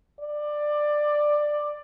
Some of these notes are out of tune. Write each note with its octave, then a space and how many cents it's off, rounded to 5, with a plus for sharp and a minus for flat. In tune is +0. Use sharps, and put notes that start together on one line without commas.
D5 +15